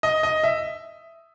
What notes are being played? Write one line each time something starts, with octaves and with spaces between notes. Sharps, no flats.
D#5
D#5
E5